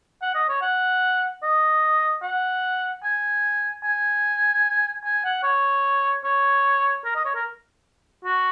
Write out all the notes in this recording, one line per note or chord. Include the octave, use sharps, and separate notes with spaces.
F#5
D#5
C#5
F#5
D#5
F#5
G#5
G#5
G#5
F#5
C#5
C#5
A#4
D#5
C#5
A#4
F#4